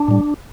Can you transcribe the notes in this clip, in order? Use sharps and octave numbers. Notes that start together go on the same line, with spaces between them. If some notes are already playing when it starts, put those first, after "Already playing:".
Already playing: D4
A2 G3